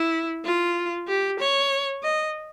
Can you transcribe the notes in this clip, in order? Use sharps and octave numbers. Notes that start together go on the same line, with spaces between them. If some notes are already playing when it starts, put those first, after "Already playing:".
Already playing: E4
F4
G4
C#5
D#5